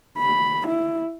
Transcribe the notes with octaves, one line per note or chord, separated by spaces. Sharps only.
B5
E4